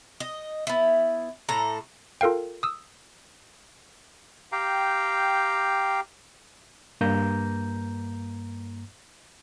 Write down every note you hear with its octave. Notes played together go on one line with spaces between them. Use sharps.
D#5
B3 E4
A2 A4 A#5
F4 A4 A#4 F5 G5
D#6 E6
G4 F5 G5 A#5
G2 A#3 A#5 G6